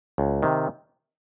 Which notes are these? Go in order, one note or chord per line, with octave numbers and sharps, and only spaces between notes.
C#2
C3 D#3